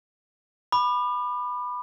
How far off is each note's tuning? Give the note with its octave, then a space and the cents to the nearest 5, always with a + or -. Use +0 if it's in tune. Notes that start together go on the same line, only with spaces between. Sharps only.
B5 +0 D6 +40